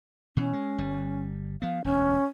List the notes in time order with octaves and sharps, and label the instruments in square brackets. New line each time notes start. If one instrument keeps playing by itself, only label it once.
[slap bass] B2 E3 [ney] C#4
[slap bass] G#3
G1 G3
[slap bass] F3 B3 [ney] F5
[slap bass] E1 D2 [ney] C#4